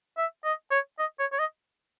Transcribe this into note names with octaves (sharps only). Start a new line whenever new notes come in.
E5
D#5
C#5
D#5
C#5
C#5
D#5